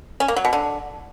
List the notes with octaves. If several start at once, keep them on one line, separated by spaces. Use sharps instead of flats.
C#4
A#3
F#3
B2
D3